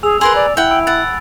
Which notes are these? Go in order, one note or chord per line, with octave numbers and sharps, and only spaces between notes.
G#4 G#5 E6 F7
G#4 A#4 B4 C6
D5
E4 F#5 G5
B5 E6 D7
F#5 A6